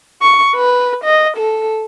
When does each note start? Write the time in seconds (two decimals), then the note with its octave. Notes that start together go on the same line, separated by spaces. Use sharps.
0.22 C#6
0.56 B4
1.04 D#5
1.37 A4